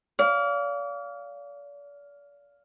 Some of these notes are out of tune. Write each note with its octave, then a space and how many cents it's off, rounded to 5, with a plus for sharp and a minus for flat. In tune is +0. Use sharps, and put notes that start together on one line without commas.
D5 -40 F5 +0